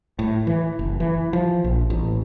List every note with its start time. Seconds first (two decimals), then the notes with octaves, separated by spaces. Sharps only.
0.19 A2
0.47 E3
0.79 F#1
1.00 E3
1.33 F3
1.64 A#1
1.90 A1